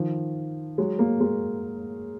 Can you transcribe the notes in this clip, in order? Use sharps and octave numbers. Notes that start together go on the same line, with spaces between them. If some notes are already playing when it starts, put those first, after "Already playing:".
Already playing: D#3 F3
F#3 G#3
G#3 A#3
G#3 A#3